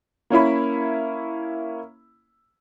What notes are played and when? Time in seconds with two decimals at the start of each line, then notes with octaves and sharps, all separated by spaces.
0.30 A#3 C#4 E4 B5